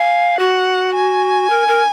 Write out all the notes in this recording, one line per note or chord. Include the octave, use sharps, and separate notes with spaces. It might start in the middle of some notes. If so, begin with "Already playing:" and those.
Already playing: F5 G#5
F#4 F#5
G#5
A#4
A#4